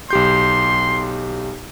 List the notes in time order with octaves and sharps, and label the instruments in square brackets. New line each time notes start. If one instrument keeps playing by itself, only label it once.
[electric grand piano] B1 G4 G6 [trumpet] C6